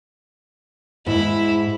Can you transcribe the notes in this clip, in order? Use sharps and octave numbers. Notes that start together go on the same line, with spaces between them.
G#2 E4